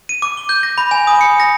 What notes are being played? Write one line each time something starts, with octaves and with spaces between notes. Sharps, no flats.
D#7
D6
G7
G6
A#6
B5
G#5
D#6
C#7
A#6